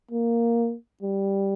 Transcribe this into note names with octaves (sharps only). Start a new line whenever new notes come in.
A#3
G3